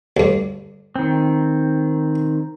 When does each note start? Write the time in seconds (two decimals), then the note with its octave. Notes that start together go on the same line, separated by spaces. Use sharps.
0.17 D2 G2
0.96 D#3 C4